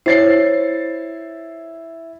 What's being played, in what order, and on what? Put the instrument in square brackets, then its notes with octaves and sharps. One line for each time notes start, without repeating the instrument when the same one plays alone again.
[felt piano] E4 A6 C7 [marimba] C5 C#5